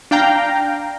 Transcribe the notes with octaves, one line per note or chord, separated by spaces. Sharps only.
D4 F5 G5 A#5